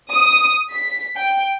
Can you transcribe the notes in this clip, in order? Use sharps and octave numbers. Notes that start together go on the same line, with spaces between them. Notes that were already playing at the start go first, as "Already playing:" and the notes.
D#6
B6
G5